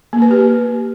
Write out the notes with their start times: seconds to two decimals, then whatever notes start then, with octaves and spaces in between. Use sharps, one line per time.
0.13 A#3
0.22 B4
0.31 G4